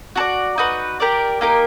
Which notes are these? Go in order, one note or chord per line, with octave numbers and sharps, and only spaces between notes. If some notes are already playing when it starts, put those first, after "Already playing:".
F#4 A4 D5
D#4 F#4 B4
G4 A#4 D5
A#3 D#4 G4 A#4